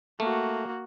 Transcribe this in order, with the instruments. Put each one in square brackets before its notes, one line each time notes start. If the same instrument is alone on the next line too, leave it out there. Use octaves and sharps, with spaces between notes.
[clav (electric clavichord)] A3 [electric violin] A#3 F#4